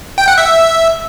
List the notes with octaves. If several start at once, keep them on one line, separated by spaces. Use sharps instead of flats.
G5
F#5
E5